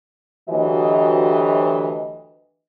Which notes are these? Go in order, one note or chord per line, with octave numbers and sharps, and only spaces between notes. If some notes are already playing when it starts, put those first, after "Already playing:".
D2 E3 F#3 G4 D#5